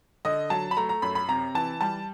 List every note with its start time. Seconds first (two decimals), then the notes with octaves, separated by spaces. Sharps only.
0.25 D3 D#5
0.50 F#3 A5
0.71 B5
0.77 A3 A#5
0.89 A#5
1.02 F#2 B5
1.15 B5
1.28 C3 A#5
1.55 E3 A5
1.81 G3 A5